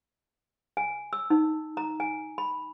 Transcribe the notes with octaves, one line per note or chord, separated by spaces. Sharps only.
G#5
E6
D#4
A#5
G#5
B5